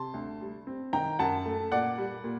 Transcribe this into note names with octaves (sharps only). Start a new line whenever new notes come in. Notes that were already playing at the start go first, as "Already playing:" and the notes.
Already playing: C3 A5 C6
D2
G3
C4
D#3 G5 A#5
F#2 F#5 A5
A3
A#2 D5 F#5
G3
A#2